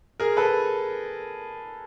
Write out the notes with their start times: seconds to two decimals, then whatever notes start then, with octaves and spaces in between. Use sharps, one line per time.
0.20 G#4 A#4
0.37 A4 B4